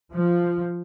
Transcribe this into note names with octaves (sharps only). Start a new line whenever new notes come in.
F3